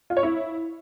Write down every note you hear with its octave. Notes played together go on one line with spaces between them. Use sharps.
F4
C#5
E4